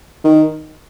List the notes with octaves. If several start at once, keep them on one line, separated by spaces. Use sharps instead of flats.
D#3